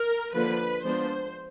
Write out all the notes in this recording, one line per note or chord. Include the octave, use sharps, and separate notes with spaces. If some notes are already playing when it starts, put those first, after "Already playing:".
Already playing: A#4
D3 F3 A#3 D4 B4
F3 G#3 B3 D4 C5